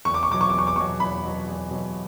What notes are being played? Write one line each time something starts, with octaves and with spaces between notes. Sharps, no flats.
E2 C#6
D6
C#6
B2 F#3 D6
C#6
E2 D6
C#6
D6
B2 F#3 C#6
E2 B5
B2 F#3
E2
B2 F#3